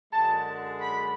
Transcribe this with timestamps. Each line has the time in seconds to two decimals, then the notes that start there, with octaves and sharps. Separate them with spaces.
0.12 F#2 D3 G#3 A5
0.80 B5